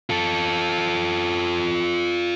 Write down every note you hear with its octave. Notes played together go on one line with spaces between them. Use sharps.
F4 A4